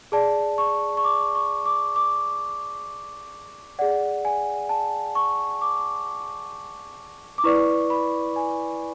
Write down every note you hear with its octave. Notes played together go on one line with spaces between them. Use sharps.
G#4 D5 A5
C#6
C#6
D6
C#6
D6
D6
G#4 D5 F#5
G#5
A5
C#6
D6
D6
E4 B4 D5 C#6
B5
G#5